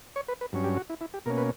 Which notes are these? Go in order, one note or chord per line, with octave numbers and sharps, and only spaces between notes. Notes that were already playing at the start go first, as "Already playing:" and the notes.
C#5
B4
B4
G2 F#3 C#4
G4
F#4
E4
E4
G4
B2 A#3 C#4 A#4
B4